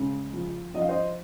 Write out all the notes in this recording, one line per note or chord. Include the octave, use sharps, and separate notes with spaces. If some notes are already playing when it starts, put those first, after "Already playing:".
Already playing: C#3 G#3
F3
F3 D#5
F5
C5 D#5